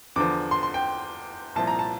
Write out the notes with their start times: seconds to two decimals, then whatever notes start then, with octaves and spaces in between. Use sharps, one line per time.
0.16 E2 D3 F3 D6
0.51 C6
0.63 C6
0.74 G5
1.55 C2 A#2 F3 A5
1.67 A#5
1.79 A5